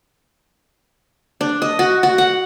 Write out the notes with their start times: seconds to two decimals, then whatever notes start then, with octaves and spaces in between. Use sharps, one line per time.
1.41 D4
1.62 D#5
1.79 F#4
2.03 F#4
2.18 F#5